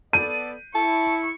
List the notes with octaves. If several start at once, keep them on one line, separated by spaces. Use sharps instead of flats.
B3 A4 D5 D#7
E4 A5 C#6